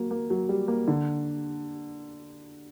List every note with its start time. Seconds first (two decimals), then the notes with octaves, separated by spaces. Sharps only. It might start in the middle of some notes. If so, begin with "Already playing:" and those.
Already playing: F#3 A#3
0.11 A#3
0.30 F#3
0.49 G3
0.68 A#3
0.88 D3